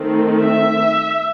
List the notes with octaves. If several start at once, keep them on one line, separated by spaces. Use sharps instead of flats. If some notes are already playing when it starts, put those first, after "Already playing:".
Already playing: D#3 A3 C4
E5